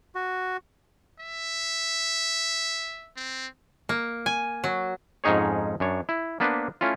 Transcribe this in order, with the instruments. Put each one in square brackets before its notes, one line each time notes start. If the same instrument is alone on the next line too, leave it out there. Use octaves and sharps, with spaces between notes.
[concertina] F#4
[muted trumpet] E5
C4
[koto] A#3
G#5
F#3
[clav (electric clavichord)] F2 G#2 C#4 D#4 G#4 C#5
F#2 D4 C#5
E4
A#3 B3 D4 B4 C5
A3 C#4 E4 F4